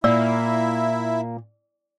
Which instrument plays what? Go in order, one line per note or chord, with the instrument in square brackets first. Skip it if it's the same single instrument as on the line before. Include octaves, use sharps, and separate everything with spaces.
[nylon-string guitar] A#2 [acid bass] A#3 [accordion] E4 E5 [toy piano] D5 E6